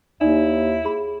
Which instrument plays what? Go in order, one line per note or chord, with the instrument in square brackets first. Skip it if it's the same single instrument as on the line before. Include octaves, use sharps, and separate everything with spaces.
[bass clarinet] D#2 [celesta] D#4 D5 [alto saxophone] E4
[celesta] G#4 B5